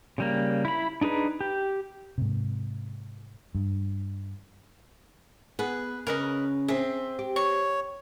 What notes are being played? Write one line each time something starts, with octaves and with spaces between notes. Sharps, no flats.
C#3 G3 A#3
E4 B5
D4 D#4 G#4 B4
G4
G#2 C3
G2
B3 G#4 B4
C#3 C#4 A#4 B4 D#5
C4 G#4 E5
G4
C#5 C#6